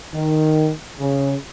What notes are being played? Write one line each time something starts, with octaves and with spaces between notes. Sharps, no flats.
D#3
C#3